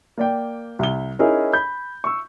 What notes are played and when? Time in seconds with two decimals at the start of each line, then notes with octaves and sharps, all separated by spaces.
0.17 A#3 D5 G5
0.79 C2 G7
1.19 C#4 D#4 E4 G#4 A#4
1.53 B5 G6
2.04 C#6 E6